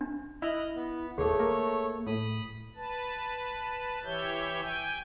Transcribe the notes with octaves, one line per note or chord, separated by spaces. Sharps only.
D4
E4 D#5 F6 F#6
B3
D#1 A3 G#4 A4 C#5
A#3
A2 B5 D#6
B4 A5
E3 G4 C#5 E5 G6
G5 G#5